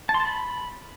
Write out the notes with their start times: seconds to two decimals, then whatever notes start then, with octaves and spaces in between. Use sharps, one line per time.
0.09 A5
0.14 C6
0.20 A5
0.25 B5